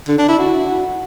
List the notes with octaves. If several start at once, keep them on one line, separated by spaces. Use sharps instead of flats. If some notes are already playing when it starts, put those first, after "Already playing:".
D3
D4
E4
F#4